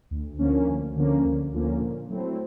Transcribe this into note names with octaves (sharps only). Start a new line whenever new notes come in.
D2
D3 F3 A#3 C#4
D2
D3 F3 A#3 C#4
D2
D3 F3 A#3 C#4
A#2
F#3 A3 C4 E4